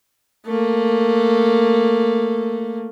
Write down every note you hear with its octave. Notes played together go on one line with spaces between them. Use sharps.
A3 A#3